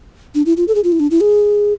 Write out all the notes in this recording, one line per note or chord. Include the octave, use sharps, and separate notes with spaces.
D4
E4
F4
A4
G#4
F4
E4
D4
E4
G#4